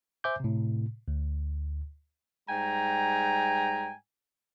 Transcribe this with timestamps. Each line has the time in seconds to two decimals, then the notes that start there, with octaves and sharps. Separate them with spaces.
0.24 C5 E5 G#5 D6 G6
0.40 A2 C3
1.08 D2
2.49 G#2 G3 G5 G#5 A#5